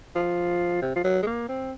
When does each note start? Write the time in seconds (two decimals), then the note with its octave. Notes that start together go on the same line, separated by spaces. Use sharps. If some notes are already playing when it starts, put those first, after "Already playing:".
0.15 F3
0.82 C3
0.96 F3
1.04 F#3
1.23 G#3
1.27 A#3
1.49 C4